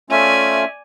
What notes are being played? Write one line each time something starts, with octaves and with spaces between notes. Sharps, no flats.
A3 C#4 F4 D5 E5 G#5